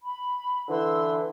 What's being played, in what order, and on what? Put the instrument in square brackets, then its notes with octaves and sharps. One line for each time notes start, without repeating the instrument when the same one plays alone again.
[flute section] B5
[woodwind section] D3 E3 [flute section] C6 E6